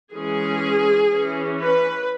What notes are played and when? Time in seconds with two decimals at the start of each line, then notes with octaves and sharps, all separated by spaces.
0.13 E3 G#3 C#4 G#4
1.11 E3 C#4
1.61 B4